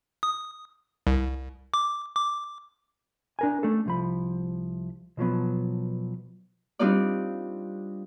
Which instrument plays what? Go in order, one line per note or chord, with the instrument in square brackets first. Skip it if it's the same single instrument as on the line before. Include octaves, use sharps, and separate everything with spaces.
[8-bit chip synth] D#6
C2
D6
D6
[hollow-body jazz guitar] D4 A#4 G#5
A3 C#4 D4 A4
C2 F3 B5
B2 F3 F#3 B3
[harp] G3 C4 D4 D#4 F4 D5